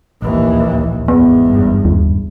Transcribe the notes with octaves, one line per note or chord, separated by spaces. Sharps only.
D1 A#1 D#2 E3
G#1 E2 B3
F#1 G2
D#2